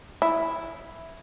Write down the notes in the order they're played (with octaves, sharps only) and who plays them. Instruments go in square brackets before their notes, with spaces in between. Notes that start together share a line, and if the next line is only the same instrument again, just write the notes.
[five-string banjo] E4